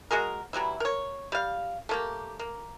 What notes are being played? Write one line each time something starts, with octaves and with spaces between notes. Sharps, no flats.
G#3 F#4 G#4 A#4
E3 F#3 G3 E4
A#4 C#5
G3 F5
A3 A#3 G4
A#3